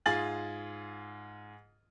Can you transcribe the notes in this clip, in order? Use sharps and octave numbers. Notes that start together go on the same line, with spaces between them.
G#2 F4 G#4 A6 F#7